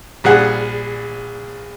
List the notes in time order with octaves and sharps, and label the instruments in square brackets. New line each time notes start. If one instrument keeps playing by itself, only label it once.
[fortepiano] A#1 G3 G#4 F#5